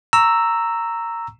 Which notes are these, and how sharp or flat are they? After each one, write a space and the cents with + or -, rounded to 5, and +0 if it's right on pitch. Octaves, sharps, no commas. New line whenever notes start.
A#5 -10 C#6 +10 E6 +0